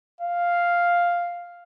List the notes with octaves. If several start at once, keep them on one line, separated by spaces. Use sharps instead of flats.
F5